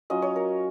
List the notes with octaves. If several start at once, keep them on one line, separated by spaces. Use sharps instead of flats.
F#3 C#4 F4 D#5
C#5
A#4